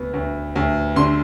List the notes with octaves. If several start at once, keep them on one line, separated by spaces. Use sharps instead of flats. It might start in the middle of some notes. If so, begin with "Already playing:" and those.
Already playing: D2 B3
D2
D2
D3 C6